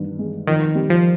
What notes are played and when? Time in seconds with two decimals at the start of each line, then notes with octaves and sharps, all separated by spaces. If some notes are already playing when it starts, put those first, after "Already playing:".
Already playing: G2 D#3
0.19 G#3
0.47 F2 D#3
0.75 G3
0.90 F3